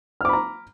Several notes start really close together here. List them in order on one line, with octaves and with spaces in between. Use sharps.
F6 D6 B5 A#5